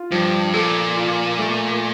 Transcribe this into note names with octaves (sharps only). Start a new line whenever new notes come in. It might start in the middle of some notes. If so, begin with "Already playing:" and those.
Already playing: F4
G2 F3
A#2 A4
F4
A3